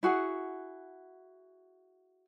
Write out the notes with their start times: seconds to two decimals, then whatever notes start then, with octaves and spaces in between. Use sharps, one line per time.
0.03 E4 F#4 G#4 F#5